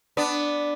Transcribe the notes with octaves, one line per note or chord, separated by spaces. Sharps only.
B3 D4